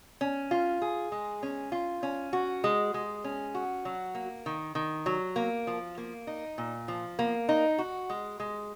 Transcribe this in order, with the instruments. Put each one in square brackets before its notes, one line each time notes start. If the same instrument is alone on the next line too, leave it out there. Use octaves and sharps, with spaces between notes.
[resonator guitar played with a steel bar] C#4
F4
G#4
G#3
C#4
F4
C#4
F#4
G#3
G#3
C#4
F#4
F#3
A#3
D#3
D#3
F#3
A#3
F3
A#3
D#4
A#2
F3
A#3
D#4
F#4
G#3
G#3